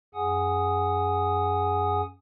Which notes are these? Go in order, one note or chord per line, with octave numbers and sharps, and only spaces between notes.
F#2 G#4 F#5 G#5 D#6